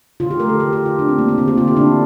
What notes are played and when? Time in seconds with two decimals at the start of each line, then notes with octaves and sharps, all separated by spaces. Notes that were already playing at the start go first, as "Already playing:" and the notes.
0.20 D3 F4
0.31 G4
0.40 A3 A#4
0.49 A4
0.59 D3 G4
0.73 G4
0.79 D3
0.86 F4
0.99 D3 D4
1.08 C4
1.18 A3 A#3
1.28 A#3
1.38 D3 C4
1.48 G4
1.58 D3 F4
1.68 E4
1.77 D3 D4